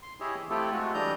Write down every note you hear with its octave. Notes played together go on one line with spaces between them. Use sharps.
C6
E4 G4 G#4 C#5 D#5 E5
E3
A3 C4 E4 F4 G4 A4
G#3 A3 F4 F#4
E3 G3 D4 D#5 A#5 G6